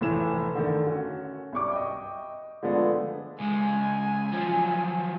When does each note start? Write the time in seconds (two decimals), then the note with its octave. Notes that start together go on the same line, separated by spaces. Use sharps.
0.01 F1 A2 E3 E7
0.55 D3 D#3 A3
0.86 C#4 F#4
1.53 C2 G3 C#6 D6
1.72 D#5 G5
2.63 D3 F3 G#3 A3 B3 D4
3.40 C#2 G#3 G#5
4.33 F3 F#3